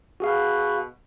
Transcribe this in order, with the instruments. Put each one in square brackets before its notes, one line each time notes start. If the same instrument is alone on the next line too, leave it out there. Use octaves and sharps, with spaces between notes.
[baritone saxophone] B2 [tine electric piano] F#4 G#4 F5